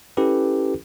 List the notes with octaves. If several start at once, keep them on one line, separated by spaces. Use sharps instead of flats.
C#4 E4 G4 A4 B4